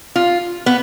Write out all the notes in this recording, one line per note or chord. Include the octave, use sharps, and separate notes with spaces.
F4
B3